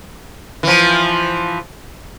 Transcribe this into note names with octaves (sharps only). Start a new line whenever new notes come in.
E3 F3